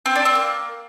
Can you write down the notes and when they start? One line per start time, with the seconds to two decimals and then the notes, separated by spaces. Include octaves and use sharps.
0.06 C4
0.15 D4
0.25 C4
0.35 A#3